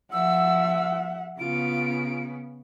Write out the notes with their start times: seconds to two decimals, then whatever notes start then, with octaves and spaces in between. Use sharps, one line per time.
0.12 F3 E5 F#5 E6
1.39 C#3 B3 F4 D7